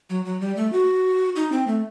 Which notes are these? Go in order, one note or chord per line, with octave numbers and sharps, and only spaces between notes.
F#3
F#3
G3
A3
F#4
D#4
C4
A3